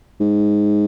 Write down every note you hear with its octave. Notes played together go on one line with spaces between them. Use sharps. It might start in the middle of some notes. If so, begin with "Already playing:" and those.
G#2